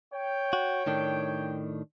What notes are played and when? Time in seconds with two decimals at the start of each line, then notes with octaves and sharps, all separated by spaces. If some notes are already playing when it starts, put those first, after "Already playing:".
0.14 C#5 G5
0.53 F#4
0.87 A2 D#3 D4